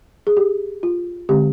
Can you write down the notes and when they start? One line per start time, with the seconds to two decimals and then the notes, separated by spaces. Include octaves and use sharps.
0.27 G#4
0.37 G4
0.83 F4
1.29 D3 G#3 C4 G4